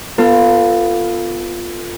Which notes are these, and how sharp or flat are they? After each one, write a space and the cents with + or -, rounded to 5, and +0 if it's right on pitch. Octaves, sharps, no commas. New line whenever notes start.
B3 +0 F4 +0 A4 +30